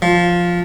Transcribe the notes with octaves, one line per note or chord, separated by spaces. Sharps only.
F3